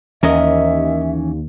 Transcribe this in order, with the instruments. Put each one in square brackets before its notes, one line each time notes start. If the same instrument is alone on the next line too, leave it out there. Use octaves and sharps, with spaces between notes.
[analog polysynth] D#2 [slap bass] E3 C#4 [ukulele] A#4 D#5 [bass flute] E5